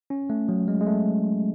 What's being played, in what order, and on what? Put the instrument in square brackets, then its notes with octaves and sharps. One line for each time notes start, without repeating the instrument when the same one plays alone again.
[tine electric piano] C#4
A3
F#3
G#3
G#3
A3